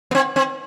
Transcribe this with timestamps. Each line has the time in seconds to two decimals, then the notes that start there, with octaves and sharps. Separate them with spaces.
0.11 B3
0.15 C4
0.36 C4